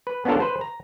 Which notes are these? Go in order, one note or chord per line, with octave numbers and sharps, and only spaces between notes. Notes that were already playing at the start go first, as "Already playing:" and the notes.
B4
B3 C#4 D4 F4 A4 A#4
B4 C5
A#5